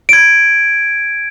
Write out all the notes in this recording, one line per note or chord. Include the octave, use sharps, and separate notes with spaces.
G#6 D7